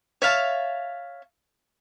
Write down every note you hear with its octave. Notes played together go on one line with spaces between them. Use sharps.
C#5 E5 F5 A5